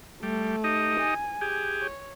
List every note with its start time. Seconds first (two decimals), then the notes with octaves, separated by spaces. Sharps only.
0.23 G3 A3
0.64 D#4 G4 D#5
1.00 G#5
1.41 G4 G#4
1.82 C#5